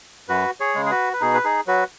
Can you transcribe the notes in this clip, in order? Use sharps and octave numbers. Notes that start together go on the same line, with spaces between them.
F#2 F#4 B4
G#4 C#5
C#3 G#3
G#4
F#4 B4
B4
B2 D#4 G#4
B4
D#4 G#4
F#3 F#4 B4